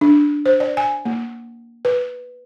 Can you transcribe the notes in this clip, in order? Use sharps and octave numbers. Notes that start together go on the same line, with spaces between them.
D4
C5
D5
G#5
A#3
B4